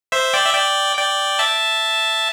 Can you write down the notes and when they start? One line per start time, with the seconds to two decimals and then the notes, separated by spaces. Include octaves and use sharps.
0.12 C5 E5
0.34 D5 G5
0.46 E5
0.54 D5 G5
0.97 D5 G5
1.39 E5 A5